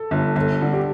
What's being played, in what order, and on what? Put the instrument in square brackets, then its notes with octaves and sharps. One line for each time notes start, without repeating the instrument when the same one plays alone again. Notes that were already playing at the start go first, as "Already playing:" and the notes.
Already playing: [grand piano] A4
[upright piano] G1
[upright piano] G1 [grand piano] A4
[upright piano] D3
[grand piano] G4